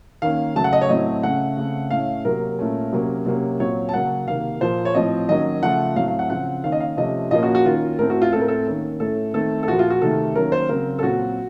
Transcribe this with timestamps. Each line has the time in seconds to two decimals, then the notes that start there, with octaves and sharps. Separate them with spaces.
0.22 D#3 A#3 C#4 F5
0.56 C#3 F#3 A3 A5
0.64 F#5
0.73 D#5
0.81 C#5
0.89 A2 F#3 A3 C4 D#5
1.23 C#3 A3 C#4 F#5
1.57 C#3 A3 C4
1.91 A2 A3 C#4 F5
2.25 C3 F#3 A#3 A#4
2.59 A#2 A3 C#4
2.93 C3 F#3 A#3 C#4
3.26 C3 F#3 A#3 C#4
3.60 A#2 F#3 C4 C#5
3.89 A5
3.94 C#3 F#3 A#3 C#4 F#5
4.27 C3 D#3 A#3 F5
4.61 A#2 F3 A#3 C5
4.85 C#5
4.95 A2 F3 C4 D#5
5.29 D#3 F#3 A#3 C#4 D#5
5.63 C#3 F3 A3 F#5
5.96 A2 F#3 A3 C4 F5
6.08 F5
6.19 F#5
6.30 C#3 F3 C4 F#5
6.64 D#3 A#3 C#4 F5
6.72 D#5
6.80 F5
6.97 C3 F3 A3 C#4 D#5
7.31 A#2 F3 A#3 C#4 D#5
7.43 F#4
7.55 F#4
7.65 D#3 A#3 C#4 F4
7.99 A2 A3 C4 A#4
8.10 F#4
8.22 F4
8.33 A2 A3 C4 A4
8.41 A#4
8.48 A4
8.67 D#3 A#3 C#4
9.00 A2 A3 C#4 A4
9.34 D#3 A3 C4 A4
9.63 A4
9.68 A#2 F3 A#3 F#4
9.79 F4
9.90 F#4
10.01 C3 D#3 A3 A4
10.35 D#3 F#3 A#3 C#4 A#4
10.52 C5
10.69 C#3 F#3 C4 A#4
10.99 A4
11.03 A#2 F#3 C4 F#4